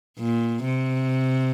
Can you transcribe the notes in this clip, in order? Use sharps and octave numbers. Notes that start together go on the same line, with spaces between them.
A#2
C3